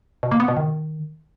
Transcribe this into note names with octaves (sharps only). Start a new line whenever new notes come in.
B2
A#3
B3
B2
D#3